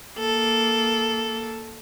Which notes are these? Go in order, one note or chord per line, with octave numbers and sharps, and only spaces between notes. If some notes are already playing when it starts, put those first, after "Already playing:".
A#3 A4